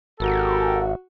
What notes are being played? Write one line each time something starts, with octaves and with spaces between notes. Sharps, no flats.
G#1 F#4 G4 A4 A#4